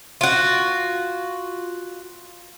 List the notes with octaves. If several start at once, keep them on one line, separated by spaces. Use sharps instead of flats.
F4 F#4